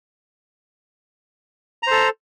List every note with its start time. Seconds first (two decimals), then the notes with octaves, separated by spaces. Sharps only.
1.83 A#5
1.87 C5
1.91 A4